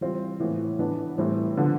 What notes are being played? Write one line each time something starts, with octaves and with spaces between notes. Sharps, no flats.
E3 G3 C4 F4
A2 E3 B3 E4
E3 B3 D4
A2 E3 G3 C4 E4
D3 F3 B3